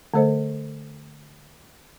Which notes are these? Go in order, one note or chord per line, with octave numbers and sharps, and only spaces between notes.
D3 A3 A4 C5 D#5